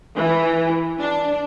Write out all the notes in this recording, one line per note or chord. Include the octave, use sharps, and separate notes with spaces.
E3
D4